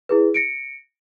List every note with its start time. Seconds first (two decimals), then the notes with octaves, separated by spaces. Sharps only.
0.09 E4 G#4 B4
0.34 A#6 C#7 D7